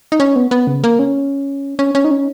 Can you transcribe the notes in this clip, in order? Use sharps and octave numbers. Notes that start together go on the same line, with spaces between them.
D#4
C#4
B3
B3
C#3
A#3
C#4
C#4
C#4
D#4
C#4